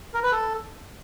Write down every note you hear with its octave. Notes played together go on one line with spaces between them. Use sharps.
A#4
B4
A4